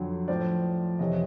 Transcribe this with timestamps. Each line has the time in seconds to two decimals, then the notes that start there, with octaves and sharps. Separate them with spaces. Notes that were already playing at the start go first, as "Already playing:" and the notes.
Already playing: F2 D3 F#3 C#5
0.28 A2 F3 C5 D5
0.99 F2 C3 E3 C#5 D#5